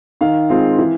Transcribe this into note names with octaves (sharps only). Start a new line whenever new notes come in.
D#3 F5
G#3 C4 F4
E3